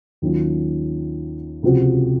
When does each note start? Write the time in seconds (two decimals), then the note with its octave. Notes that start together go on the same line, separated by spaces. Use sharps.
0.22 D#2 D#3 F#3 C#4 F4
1.63 C#2 C3 F3 C4 F#4